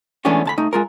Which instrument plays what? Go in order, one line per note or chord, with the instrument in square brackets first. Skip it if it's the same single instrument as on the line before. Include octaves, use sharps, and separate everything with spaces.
[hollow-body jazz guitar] E3 G#3 A3 B3 C#4 D4
D2 A5 B5
A3 D#4
G#3 F4 A#4